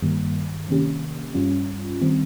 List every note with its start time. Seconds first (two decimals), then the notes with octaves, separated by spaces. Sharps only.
0.02 G2 D#3 G3 A#3
0.68 C3 D#3 A#3 C#4 G4
1.34 G2 G3 C#4 F4
2.01 D#3 G3 C4